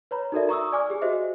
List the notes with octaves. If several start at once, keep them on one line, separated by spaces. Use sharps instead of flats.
B4 C#5 A#5 B5
D#4 F#4 A4 A#4 D5 E5
A#5 C#6 D#6 E6
D5 G#5 D6 F6
G4 G#4
F#4 G4 C5 D#5 E5